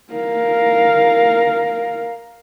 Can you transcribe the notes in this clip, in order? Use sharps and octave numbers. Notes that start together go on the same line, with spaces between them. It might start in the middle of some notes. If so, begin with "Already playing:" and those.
A#4 F5